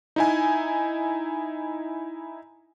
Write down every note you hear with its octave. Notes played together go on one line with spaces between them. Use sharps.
D#4 E4 G#5